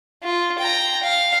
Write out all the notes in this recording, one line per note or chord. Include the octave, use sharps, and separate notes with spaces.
F4
G5 A#5
F5